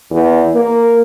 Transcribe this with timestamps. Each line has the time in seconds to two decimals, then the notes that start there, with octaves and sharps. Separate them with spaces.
0.11 E2
0.55 A#3